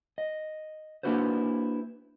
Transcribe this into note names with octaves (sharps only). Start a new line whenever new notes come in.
D#5
A#3 D4 E4 F#4 B4 C5